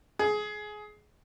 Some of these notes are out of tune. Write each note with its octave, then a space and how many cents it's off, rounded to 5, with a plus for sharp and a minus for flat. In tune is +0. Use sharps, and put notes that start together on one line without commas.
G#4 +20